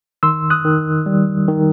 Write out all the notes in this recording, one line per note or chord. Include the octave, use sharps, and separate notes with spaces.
D#3 C6 E6
D#6 F#6
D#3
G3
D#3